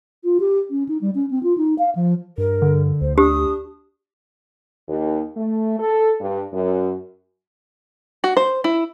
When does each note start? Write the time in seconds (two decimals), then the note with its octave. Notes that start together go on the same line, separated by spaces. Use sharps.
0.24 F4
0.40 G4
0.70 C#4
0.88 D#4
1.01 G3
1.15 C#4
1.31 C4
1.43 F4
1.57 D#4
1.78 F5
1.95 F3
2.38 G2 A#4
2.62 D3
3.01 D2 C5
3.18 D4 G4 D#6
4.88 D#2
5.36 A3
5.79 A4
6.20 G2
6.53 F#2
8.24 F#4
8.37 C5
8.64 E4